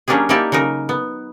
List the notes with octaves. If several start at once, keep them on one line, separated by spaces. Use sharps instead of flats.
F#3 A#3 C#4 D4 G4 G#4
A#3 D#4 E4 G4 D5 A5
C#3 F#3 D#4 A#4
B3